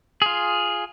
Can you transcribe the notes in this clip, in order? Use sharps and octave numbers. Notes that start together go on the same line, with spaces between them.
F4 G#4